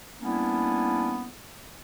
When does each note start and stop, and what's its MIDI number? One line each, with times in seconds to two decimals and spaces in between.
0.20 1.27 55
0.20 1.27 58
0.20 1.27 59
0.20 1.27 61
0.20 1.27 62
0.20 1.27 64